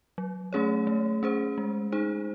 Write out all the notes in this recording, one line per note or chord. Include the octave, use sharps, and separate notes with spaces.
F#3
A3 C#4 G#4 C#5
A3
C#4 G#4 C5
G#3
D#4 G#4 C5